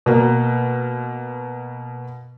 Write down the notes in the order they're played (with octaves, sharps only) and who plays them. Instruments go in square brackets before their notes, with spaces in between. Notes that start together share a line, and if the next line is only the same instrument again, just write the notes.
[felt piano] B2 A#3